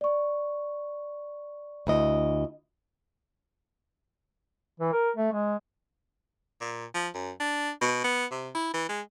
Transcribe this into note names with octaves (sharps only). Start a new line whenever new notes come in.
D5 C#6
D2 E4 D#5
E3
A#4
A3
G#3
A#2
F3
F#2
D4
B2
B3
C3
E4
E3
G#3